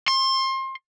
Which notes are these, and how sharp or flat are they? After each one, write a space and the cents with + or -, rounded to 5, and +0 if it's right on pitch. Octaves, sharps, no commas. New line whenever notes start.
C6 +30